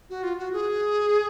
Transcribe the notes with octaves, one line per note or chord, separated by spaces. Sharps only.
F#4
F4
F#4
G#4